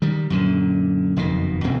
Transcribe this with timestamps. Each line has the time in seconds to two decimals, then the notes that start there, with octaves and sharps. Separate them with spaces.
0.02 D#3 G3
0.30 F#2 A#2 D3
1.16 F#1 F2 B2 D#3
1.64 D1 B2 C4